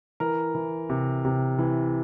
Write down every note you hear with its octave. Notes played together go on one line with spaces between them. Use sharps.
E3 A#4
E3
C3
C3
E3